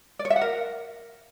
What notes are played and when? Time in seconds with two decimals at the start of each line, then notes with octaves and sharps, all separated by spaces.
0.19 D5
0.25 C#5
0.30 E5
0.36 F#5
0.41 A#4